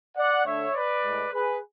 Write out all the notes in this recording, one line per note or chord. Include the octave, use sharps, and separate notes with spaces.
D5 F#5
D3 A3 C#5 E5
B4 D5
A2 G#3
G#4 B4